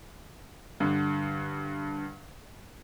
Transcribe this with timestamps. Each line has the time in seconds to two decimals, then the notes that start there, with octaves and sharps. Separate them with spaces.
0.80 G2 D3